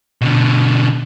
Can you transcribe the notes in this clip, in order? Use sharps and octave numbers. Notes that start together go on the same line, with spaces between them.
B2 D3